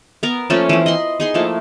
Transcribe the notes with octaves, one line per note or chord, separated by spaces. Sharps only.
B3 A#4
F3 A3 A#3 C#4
E3 A#3 C4
D#5 B5 C6
D#4 G#4 C6
F3 A3 A#3 E4